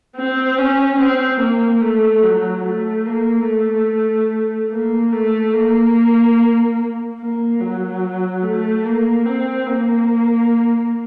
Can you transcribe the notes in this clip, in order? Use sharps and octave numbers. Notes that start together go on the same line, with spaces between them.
C4
C#4
C4
A#3
A3
F#3
A3
A#3
A3
A#3
A3
A#3
A#3
F#3
A3
A#3
C4
A#3